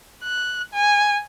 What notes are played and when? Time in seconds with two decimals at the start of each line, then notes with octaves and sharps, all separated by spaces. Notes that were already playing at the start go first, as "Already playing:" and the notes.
0.24 F#6
0.73 G#5